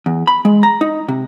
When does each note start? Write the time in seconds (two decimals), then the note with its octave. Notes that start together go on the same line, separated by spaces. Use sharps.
0.06 E2
0.27 B5
0.45 G#3
0.63 A#5
0.81 D#4
1.08 C3